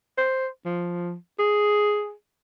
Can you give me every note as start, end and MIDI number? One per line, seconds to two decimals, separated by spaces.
0.17 0.47 72
0.65 1.14 53
1.39 2.12 68